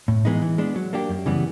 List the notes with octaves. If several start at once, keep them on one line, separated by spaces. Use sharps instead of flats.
A2
E3 G#3 B3 D#4
E3
G#3 B3 D4
F#3
A#3 D4 G4
F#2
C#3 E3 G3 B3